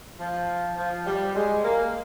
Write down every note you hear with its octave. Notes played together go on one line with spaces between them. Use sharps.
F3
F3
G3
G#3
A#3